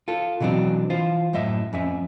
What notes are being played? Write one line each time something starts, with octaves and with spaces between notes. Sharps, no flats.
F4 A4
B2 E3 F#3 C4 D4
E3 F4 C5
F#2 A2 D#5 E5
F2 C#4 E5